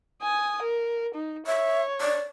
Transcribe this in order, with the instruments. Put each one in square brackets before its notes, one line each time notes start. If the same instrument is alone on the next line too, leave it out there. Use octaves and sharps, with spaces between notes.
[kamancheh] G#5 D#6
A#4
D#4
[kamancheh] C#5 [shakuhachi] E5
[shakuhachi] D5